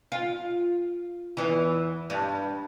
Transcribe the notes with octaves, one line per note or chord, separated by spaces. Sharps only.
F4
E2 E3
G2